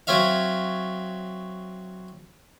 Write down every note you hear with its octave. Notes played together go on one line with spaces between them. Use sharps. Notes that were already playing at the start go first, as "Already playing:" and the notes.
F#3 C4 C#5 E5 F5